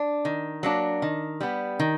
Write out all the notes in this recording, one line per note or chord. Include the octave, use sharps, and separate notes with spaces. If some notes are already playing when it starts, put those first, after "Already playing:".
Already playing: D4
D#3
F#3 A#3 D4
D#3
G3 B3
D#3